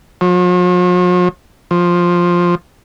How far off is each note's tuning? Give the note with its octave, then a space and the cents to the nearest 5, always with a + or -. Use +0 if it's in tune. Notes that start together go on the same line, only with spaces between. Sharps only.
F3 +45
F3 +5